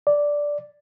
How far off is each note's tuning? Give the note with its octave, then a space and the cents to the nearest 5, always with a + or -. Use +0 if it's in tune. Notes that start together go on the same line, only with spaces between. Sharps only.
D5 -5